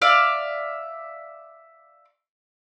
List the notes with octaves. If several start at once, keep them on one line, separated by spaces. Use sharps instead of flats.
D5 E5 F5